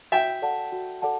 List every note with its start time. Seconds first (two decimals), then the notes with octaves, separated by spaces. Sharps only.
0.12 F#4 E5 G5
0.42 A4 D5 F#5 A5
0.72 F#4
1.02 A4 D5 F#5 A5